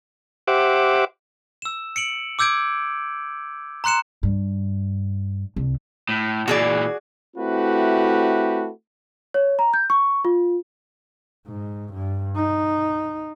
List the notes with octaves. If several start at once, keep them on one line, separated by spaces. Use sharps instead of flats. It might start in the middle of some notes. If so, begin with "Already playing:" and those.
G4 C5 E5 F#5 D6
E6 E7
C#7 D7 F#7
D6 E6 G6 G#6 D7
A#5 C6 F#6 C#7 E7
G2
C2
A2
A#2 E3 F#4 G#4 D5
A3 C4 E4 F#4 G4 B4
C#5
A#5
G6
C#6
F4
G#2
G2
D#4